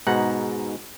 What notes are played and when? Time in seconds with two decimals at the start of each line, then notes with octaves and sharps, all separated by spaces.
0.07 G#2 B2 D#4 F#5